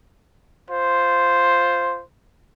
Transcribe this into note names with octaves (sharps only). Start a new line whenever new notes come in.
F4 C5